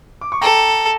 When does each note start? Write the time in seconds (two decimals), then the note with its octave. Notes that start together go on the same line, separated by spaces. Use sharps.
0.21 D6
0.32 C#6
0.42 A4 G5 A#5